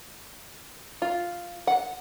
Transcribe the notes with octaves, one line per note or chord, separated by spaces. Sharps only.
F4
F#5